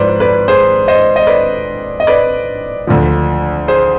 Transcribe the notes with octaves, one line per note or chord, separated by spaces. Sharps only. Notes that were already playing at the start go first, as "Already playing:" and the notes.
Already playing: G#2 F3 B4 C5 D5
B4 D5
G#4 C5
C5 D#5
D#5
B4 D5
D#5
B4 D5
D2 D3 F3
G#4 C5